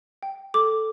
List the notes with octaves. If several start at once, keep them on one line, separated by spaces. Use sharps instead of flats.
G5
A4 D6